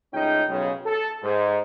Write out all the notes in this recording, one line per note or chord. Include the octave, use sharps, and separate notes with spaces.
C#2 A2 C#4 D#4 G5
B1 F#2 C#3
A4
G#2